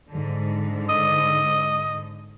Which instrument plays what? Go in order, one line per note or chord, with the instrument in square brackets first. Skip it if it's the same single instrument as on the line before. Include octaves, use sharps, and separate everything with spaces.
[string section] G#2 D3
[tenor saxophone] D#5